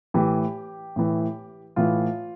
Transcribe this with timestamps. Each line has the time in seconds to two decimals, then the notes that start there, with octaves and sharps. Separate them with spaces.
0.14 A2 E3 G4
0.96 A2 E3
1.76 A2 E3 F4